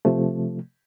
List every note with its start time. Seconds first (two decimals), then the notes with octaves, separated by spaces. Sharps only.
0.05 C3 F3 A3